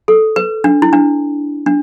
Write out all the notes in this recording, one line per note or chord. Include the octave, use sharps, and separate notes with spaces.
A4
B4
D4
E4
D4
D4